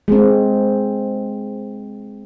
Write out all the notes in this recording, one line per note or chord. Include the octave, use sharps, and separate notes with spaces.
G#3 C4